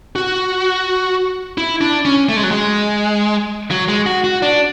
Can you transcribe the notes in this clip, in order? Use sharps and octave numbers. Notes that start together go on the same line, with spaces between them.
F#4
E4
D4
C#4
A3
G#3
F#3
G#3
F#3
G#3
F#4
F#4
D4